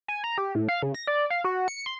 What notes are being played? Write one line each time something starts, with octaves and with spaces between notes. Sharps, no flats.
G#5
A#5
G4
A2
F5
C#3
A#6
D5
F5
F#4
C#7
C6